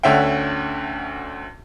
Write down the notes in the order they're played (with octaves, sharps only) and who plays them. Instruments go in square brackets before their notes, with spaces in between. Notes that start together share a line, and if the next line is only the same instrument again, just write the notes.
[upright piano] D2 D3 C#4 E5 F#5 G5